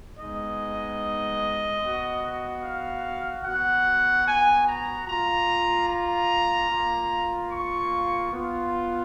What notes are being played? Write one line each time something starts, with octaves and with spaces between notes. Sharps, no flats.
G#3 B3 D#4 D#5
B3 F#4
F5
B3 F#4 F#5
G#5
A#5
A#3 F4 A#5
A#5
A#3 F4
C#6
B3 F4